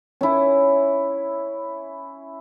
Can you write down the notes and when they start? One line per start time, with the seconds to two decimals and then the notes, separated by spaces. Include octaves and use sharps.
0.21 C#4 E4